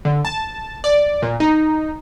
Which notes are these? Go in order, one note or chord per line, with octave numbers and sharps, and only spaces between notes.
D3
A5
D5
A#2
D#4